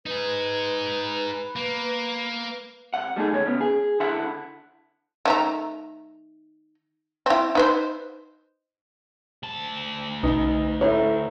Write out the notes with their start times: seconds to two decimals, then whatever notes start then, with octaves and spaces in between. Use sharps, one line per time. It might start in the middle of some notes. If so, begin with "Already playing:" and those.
0.06 D#4 G#4 B4
1.56 A#3
2.94 C2 F#5
3.16 G3 A3 D#4 G#4
3.32 E2 C#3 C#5
3.46 C#3 B3
3.61 G#4
4.00 D3 E4 E5 F#5
5.25 D#3 A3 A#5
7.26 C4 E4
7.55 D#4 B4 C5
9.43 D2 A5
10.23 B1 D#4 B4 D#5
10.81 A2 A3 B4 C#5 E5 A#5